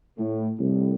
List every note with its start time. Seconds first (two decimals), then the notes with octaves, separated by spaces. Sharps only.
0.18 A2
0.58 C2 A2